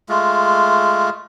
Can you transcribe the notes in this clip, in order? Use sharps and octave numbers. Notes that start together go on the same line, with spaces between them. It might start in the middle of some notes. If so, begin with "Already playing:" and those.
G#3 A3 F4